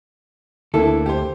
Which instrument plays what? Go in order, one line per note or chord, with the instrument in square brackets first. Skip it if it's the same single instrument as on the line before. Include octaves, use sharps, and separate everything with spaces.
[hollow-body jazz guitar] D2 A4 [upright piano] D3 A#3 E4
[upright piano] G4 C5